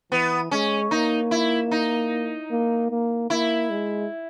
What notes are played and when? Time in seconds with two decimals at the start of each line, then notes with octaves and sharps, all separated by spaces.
0.12 E3 B3
0.51 G#3 C#4
0.91 A#3 D#4
1.31 E4
1.71 D#4
2.51 A#3
2.91 A#3
3.30 A#3 E4
3.70 G#3